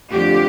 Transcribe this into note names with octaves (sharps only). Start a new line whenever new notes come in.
F2 D3 A3 D4 G4